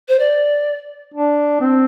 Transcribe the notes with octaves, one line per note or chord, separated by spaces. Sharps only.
C5
D5
D4
C4